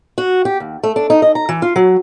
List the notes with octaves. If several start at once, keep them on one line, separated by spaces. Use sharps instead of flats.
F#4
G4
D#2
A3
D4
D#4
D#5
A#5
E3
F4
F#3